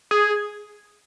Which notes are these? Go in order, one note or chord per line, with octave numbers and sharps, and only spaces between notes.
G#4